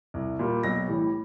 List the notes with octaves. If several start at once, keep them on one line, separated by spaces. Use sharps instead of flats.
C2
A#2 G3
B1 A#6
A2 E3 G3